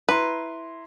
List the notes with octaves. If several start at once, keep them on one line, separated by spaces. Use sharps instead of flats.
E4 B4 A#5 C6